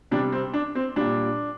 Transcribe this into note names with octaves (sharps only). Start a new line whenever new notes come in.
C3 G3 D4
C4
D4
C4
A#2 G3 D4